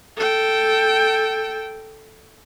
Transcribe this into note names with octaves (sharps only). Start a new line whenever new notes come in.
A4 G5